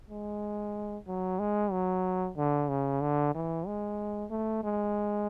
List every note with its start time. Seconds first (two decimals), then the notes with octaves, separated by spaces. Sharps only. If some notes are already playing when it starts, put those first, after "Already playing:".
0.10 G#3
1.08 F#3
1.39 G#3
1.72 F#3
2.37 D3
2.69 C#3
3.01 D3
3.35 E3
3.67 G#3
4.31 A3
4.64 G#3